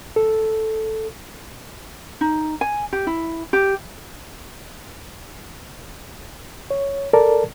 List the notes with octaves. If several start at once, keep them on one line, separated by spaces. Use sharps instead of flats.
A4
D#4
G#5
G4
E4
G4
C#5
A4 A#4 D5 A5